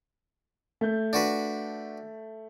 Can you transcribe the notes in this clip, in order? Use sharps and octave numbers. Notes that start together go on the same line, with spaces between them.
A3 G6
D4 F#4 B4